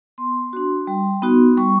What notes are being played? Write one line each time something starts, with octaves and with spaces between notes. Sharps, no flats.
B3 C6
D4 F#4
G3
B3 D#4 F#4
G3 C#6